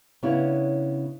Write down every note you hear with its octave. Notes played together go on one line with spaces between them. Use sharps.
C#3 B3 D4 E4 C#5